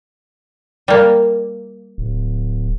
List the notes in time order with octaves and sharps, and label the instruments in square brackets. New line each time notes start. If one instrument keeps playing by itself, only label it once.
[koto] G3 A#3
[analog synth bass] D1